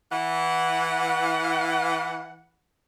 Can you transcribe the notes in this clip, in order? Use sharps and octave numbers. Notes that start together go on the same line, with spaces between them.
E3 F#5